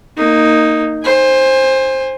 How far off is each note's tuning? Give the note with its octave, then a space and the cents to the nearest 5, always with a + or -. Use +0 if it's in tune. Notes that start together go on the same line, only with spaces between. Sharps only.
A#3 -15 D#4 +0
C5 +15 G#5 -25